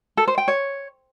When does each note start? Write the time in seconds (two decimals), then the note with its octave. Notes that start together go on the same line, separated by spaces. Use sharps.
0.17 A4
0.28 C5
0.38 G5
0.48 C#5